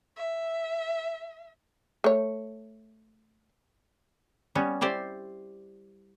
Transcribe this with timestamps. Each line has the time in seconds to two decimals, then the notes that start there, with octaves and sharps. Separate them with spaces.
0.16 E5
2.04 A3 C#5
4.55 G3 B3 C#4
4.81 E4 G4 C5 D5